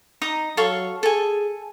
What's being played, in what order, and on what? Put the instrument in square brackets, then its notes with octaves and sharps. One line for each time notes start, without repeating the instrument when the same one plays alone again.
[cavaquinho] D#4 A#5 D#6
[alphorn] F#3 [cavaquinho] A4 F5 C#6
[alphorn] G#4 [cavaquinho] A4 G#5